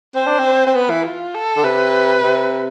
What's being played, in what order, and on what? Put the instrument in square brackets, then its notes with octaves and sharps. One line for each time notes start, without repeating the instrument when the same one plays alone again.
[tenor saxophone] C4 [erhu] C5
[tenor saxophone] D4
C4
C4
[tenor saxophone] B3 [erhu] B4
[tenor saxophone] E3
[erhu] F4
A4
[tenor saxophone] D3
[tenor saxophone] C3 [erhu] B4
[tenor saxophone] C3